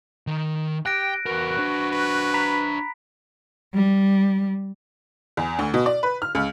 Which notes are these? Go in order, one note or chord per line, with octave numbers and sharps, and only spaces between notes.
D#3
G4 G5 F#6 A#6 D7
E2 F#4 A#4 B4
D4 C5
B4
A#5 B5 B6
G3
E2
D2
B2
D5
B4
F6
C#2